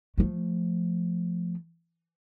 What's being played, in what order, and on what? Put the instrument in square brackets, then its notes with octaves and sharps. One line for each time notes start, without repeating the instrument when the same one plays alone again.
[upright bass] F3 A3